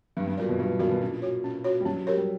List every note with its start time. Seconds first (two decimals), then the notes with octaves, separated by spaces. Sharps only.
0.17 G2 F#3
0.27 G2
0.37 A#2 B3 F#4 A#4 D5
0.49 B2
0.59 G2 F#3
0.79 G2 B3 F#4 A#4 D5
0.91 B2
1.01 A#2 C#4
1.22 F#4 C#5
1.44 C#4
1.64 F#4 C#5
1.80 G3
1.85 F#3 C#4
2.07 G4 A#4 C#5
2.17 G3